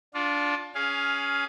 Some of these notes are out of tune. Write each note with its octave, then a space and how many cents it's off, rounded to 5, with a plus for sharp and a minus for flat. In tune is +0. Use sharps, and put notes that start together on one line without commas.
D4 -15 F4 +20
C#4 +15 G#4 +0 F5 +5